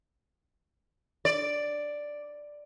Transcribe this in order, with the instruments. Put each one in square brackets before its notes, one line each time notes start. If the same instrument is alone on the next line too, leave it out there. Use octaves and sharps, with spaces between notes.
[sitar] D5